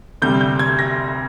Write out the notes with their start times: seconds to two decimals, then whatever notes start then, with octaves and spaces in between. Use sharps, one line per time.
0.22 D2 C3 G3 G6
0.41 G6
0.59 G#6
0.79 A#6